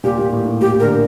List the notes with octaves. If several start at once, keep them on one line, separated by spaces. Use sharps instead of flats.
A#2 G4
A#2
A2
A2
A#2 G4
D3 A#4